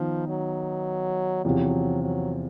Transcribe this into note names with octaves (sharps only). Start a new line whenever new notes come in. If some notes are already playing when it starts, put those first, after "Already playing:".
Already playing: D#3 F3 B3 D#4
F#3
E2 C3 F3 F#3
F#3